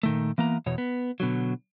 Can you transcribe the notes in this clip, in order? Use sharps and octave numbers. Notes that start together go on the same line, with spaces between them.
A#2 D#3 A3
E3 A#3 B3 A#5
E2 B2 C#5
B3
B2 D3 F#3